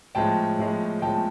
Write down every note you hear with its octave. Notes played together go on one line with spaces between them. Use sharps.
A2 F3 G#3 C#4 G5 A5
A2 F3 G#3 C#4
A2 F3 G#3 C#4 G5 A5